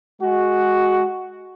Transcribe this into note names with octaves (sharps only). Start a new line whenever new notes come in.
G#3 F#4